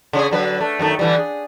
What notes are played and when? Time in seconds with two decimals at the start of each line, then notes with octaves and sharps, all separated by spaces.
0.13 C#3 C#4 G#4
0.31 D3 F#3 B4
0.61 A3
0.79 F#2 D#3 A3
0.99 D3 E3 G3
1.18 G#4